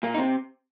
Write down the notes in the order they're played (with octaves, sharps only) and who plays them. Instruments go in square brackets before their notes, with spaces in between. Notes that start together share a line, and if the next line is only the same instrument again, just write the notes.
[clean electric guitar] A#2 A#3
D#4
C3 C4